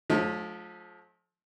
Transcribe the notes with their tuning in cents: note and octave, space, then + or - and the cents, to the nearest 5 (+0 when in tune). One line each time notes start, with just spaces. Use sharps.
F3 +30 A3 -40 D#4 -25